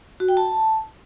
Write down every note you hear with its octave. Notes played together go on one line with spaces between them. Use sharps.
F#4
G5
A5